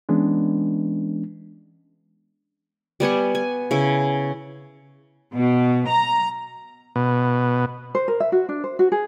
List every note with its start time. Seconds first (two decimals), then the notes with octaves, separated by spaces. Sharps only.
0.09 E3 G#3 B3 C#4 D4
3.00 G3 B3 G#5 C#6
3.35 G#5
3.71 C#3 E4
5.34 B2
5.89 A#5
6.96 B2
7.95 C5
8.08 A#4
8.20 E5
8.32 F#4
8.49 D4
8.64 C5
8.79 F#4
8.92 G#4